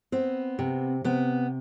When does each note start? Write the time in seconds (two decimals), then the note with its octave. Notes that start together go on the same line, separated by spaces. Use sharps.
0.12 B3 C4
0.59 C3
1.04 C3 B3